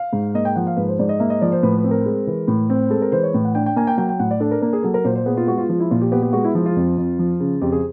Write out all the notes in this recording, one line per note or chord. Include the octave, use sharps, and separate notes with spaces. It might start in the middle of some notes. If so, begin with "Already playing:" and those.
Already playing: F5
G#2
A#3 D#5
G5
F3 F#5
F5
G#2 B4
C5
G#2 D5
D#5
A#3 E5
D#5
F3 D5
C5
A2 B4
B4
C4
A#4
G#3
E3
A2
C4
G#3 A4
A#4
E3 C5
C#5
A2
F#5
D4 G5
G5
A#3 G#5
G5
F#3 G5
G5
A2 F#5
D5
D4 A4
A#4
A#3 A#4
G#4
F#3 A4
A#4
A#2 C5
C5
B3 G#4
F4
G#3 F#4
F4
F3 F4
E4
A#2 F4
G4
B3 G4
G4
G#3 F#4
E4
F3 E4
F4
F2
F2
F3
C#3
F2 G4
G#4